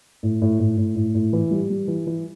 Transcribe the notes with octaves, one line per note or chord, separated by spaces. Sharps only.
A2
A2
A2
A2
A2
A2
E3
G3
G3
E3
E3